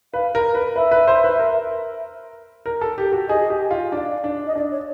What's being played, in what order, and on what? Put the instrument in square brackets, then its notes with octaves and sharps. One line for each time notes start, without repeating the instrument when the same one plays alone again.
[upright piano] B4 [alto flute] F5
[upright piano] A#4
B4
[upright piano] B4 [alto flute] E5
[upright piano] B4
C5
B4
A#4
A#4
A4
G4
F#4
[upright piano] G#4 [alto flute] D#5
[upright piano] G4
F4
[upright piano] D4 [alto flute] D5
[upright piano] D4
[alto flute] D#5
[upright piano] D4 [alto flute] D5
[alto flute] C#5